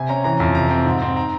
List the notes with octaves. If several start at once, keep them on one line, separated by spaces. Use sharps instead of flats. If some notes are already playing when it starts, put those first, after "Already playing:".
Already playing: C3 G#5
C#4 A#5
E3 A#5
F2 A#5
C3 A#5
C4
G#2
C4
A#5